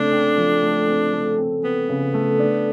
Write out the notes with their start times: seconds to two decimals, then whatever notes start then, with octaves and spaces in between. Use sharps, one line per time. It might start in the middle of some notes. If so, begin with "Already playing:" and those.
Already playing: C#3 A3 C4 D4
0.12 C4
0.38 F3
0.62 A3
0.88 C4
1.13 A3
1.38 C4
1.63 B3 C4
1.89 C#3
2.14 A3
2.40 D4